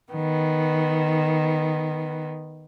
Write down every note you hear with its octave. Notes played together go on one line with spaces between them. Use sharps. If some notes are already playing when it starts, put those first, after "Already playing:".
D#3 B3